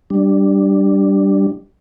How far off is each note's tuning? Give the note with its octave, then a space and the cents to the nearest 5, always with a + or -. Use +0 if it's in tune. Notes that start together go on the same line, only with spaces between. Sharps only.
G3 -5 D4 +0